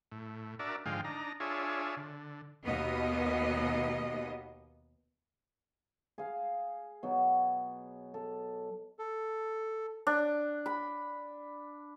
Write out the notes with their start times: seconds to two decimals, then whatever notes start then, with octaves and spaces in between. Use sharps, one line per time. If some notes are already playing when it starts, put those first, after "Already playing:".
0.11 A2
0.59 D4 F#4 A#4 D5 E5
0.86 G#2 D3 F3 G#3 F5 G5
1.05 D4 D#4 A#5
1.40 D4 F4 G#4 C#5 E5
1.97 D3
2.65 D#2 B2 A#3 B3 D#5
6.18 G#4 F5
7.03 B2 F#3
8.14 A4
8.99 A4
10.07 D4
10.66 B5